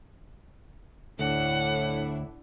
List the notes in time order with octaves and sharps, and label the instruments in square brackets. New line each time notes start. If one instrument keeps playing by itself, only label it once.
[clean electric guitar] D2 [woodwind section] A2 [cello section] D4 E4 [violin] F#5